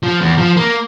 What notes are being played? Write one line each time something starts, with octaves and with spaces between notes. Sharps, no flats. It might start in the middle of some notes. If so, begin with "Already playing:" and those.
F3
E2
F3
A#3